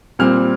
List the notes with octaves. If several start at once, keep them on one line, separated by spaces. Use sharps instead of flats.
A#2 G3 C4 F6